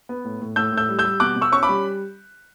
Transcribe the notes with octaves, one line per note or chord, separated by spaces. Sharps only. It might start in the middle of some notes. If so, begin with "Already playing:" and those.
B3
A2
A2
A2 E6 G6
A2
E6 G6
G3
E6 G6
G3
B2 D6 F#6
B2
C#6 E6
C#4 C#6
B5 D6
G3